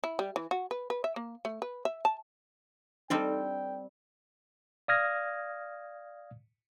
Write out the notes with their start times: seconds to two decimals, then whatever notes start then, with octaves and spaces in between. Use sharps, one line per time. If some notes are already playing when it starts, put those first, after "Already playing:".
0.04 E4
0.19 G3
0.36 E3
0.51 F#4
0.71 B4
0.90 B4
1.04 E5
1.16 A#3
1.45 A3
1.62 B4
1.85 E5
2.05 A5
3.10 G3 C4 D4 D#4 A4 D5 G5
4.88 D5 F5 D#6 F6 G#6 A#6